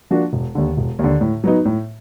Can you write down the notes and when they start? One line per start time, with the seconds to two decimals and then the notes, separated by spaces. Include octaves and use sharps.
0.11 F3 A#3 D4 F#4
0.33 E1
0.55 D#2 D3
0.77 E1
0.99 D#2 D3
1.21 A2
1.44 F#3 B3 D#4
1.65 A2